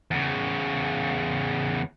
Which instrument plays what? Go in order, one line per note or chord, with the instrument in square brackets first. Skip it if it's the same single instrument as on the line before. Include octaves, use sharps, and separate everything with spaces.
[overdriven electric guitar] E2 C#3